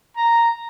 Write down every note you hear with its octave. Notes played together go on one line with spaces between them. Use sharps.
A#5